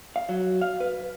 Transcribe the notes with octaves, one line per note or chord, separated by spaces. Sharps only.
F5
F#3
F5
B4